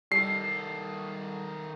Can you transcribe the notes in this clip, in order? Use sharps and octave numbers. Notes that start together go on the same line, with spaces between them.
D#3 G3 A4 C7